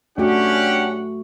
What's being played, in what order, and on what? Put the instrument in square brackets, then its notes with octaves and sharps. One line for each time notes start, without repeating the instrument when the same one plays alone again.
[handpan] A3 F#4 [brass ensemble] C#4 D4 G4 [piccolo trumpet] F#5